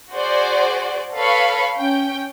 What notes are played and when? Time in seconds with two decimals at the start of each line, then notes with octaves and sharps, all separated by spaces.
0.11 F#4 G#4 C5 D5
1.16 A4 B4 C#5 F5 B5 C#6
1.77 C#4 G5